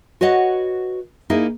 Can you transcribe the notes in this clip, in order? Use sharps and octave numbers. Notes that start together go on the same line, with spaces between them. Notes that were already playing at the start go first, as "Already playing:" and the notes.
F#4 B4 C#5 D#5 F#5
A#3 D#4 E4 G#4